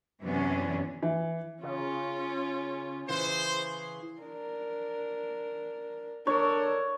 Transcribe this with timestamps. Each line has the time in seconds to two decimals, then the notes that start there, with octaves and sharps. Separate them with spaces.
0.22 F#2 C3 E3 B3 C#4 D4
1.03 E3
1.63 C#3 C#4 F4
3.08 C#3 E3 G#4 C5 C6
4.21 D4 A#4
6.27 D4 A4 A#4 C#5